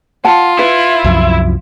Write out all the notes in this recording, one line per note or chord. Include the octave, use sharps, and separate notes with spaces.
F4 F#5 A5
E4 B4
C2 F#2 F3